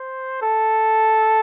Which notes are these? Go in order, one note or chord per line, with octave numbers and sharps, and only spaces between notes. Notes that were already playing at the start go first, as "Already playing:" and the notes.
Already playing: C5
A4